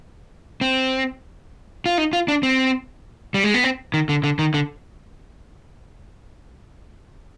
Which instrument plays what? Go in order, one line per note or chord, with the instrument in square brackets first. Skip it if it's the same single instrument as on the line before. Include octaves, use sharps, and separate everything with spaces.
[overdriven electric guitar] C4
F4
D#4
F4
D4
C4
G3
G#3
B3
C4
D#3
D3
D3
D#3
D3